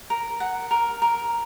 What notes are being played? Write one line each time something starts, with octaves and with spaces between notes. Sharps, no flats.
A#4
F#5
A#4
A#4